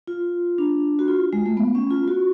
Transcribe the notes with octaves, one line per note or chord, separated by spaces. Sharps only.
F4
D4
F#4
F4
G#3
A3
B3
C#4
F4
F#4